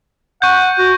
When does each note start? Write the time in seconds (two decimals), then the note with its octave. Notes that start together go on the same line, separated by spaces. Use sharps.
0.42 F#5 C#6 G6
0.78 F#4